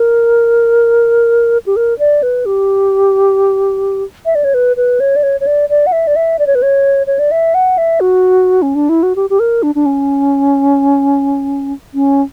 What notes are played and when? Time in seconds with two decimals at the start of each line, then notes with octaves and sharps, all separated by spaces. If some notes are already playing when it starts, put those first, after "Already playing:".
Already playing: A#4
1.66 G4
1.76 A#4
1.99 D5
2.23 B4
2.46 G4
4.26 E5
4.35 D5
4.44 C#5
4.54 B4
4.77 B4
5.00 C#5
5.16 D5
5.23 C#5
5.41 C#5
5.47 D5
5.69 D5
5.87 F#5
5.92 E5
6.07 D5
6.16 E5
6.39 D5
6.47 C#5
6.55 B4
6.62 C#5
7.07 C#5
7.19 D5
7.31 E5
7.54 F#5
7.78 E5
8.00 F#4
8.62 C#4
8.75 D4
8.89 E4
9.03 F#4
9.16 G4
9.30 G4
9.40 A#4
9.63 D4
9.75 D4
9.86 C#4
11.94 C#4